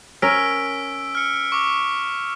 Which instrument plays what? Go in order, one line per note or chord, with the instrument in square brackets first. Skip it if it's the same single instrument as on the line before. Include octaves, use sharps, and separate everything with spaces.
[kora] C#4 A#4 [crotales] E6 B6 D7
[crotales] F6 C#7
C#6 D6